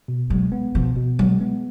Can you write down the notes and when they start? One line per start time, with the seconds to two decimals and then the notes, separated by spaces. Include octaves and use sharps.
0.08 B2
0.30 F#3 G#3
0.52 B3
0.75 B2 F3
0.97 B2
1.19 F#3 G#3
1.41 B3